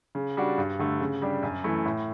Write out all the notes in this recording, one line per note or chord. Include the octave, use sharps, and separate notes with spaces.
C#3
G3 D4 F#4
G2
D3 A3
C#3
G3 D4 G4
F#2
E3 A3 E4
A2